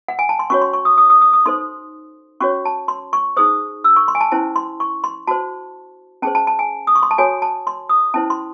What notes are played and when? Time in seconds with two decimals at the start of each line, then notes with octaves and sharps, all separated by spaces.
0.08 F#5
0.19 G#5
0.29 A5
0.39 C6
0.50 C#4 F#4 C#5 C#6
0.61 C6
0.73 C#6
0.85 D#6
0.98 D#6
1.10 D#6
1.21 D#6
1.33 D#6
1.46 D#4 A4 C5 C6
2.40 C#4 F#4 C#5 C#6
2.65 A5
2.88 C6
3.13 C#6
3.37 D#4 G#4 C5 D#6
3.84 E6
3.96 C#6
4.08 C6
4.15 G#5
4.21 A5
4.32 C#4 E4 C5 A5
4.56 C6
4.80 C#6
5.04 C6
5.27 F#4 C5 A5
6.22 C#4 G#4 C5 A5
6.35 A5
6.47 A5
6.59 G#5
6.87 D#6
6.95 C#6
7.03 C6
7.11 A5
7.18 F#4 A4 C#5 G#5
7.42 A5
7.67 C6
7.89 D#6
8.14 C#4 E4 C5 A5
8.30 C6